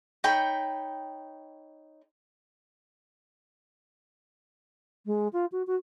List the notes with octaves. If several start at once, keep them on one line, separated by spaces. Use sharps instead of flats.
D#4 C#5 G5 B5
G#3
F4
F#4
F#4